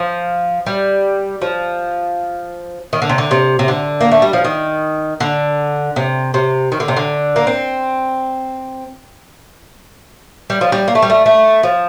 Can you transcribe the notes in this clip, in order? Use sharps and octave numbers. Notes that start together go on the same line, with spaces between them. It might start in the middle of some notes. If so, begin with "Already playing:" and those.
Already playing: F3
G3
F3
D#3
D3
C3
D3
C3
C3
D3
A#3
A3
G3
F3
D#3
D3
C3
C3
D#3
D3
C3
D3
A#3
C4
G3
F3
G3
A#3
A3
G3
A3
A3
F3